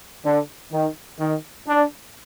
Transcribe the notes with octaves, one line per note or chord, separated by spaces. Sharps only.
D3
D#3
D#3
D4